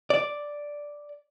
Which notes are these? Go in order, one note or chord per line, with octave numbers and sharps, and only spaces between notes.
D5